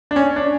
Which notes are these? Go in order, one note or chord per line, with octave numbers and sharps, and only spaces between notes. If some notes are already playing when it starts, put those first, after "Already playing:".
D4
C#4
D4